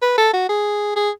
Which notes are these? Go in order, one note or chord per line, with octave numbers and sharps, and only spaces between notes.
B4
A4
F#4
G#4
G#4